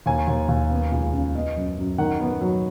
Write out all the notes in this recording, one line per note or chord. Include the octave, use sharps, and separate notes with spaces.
D#2 G#5
D#2
D#2
B3
C#2
C#3
B3 D#5
F#2
F#2
D#3 F#5
B3
F#3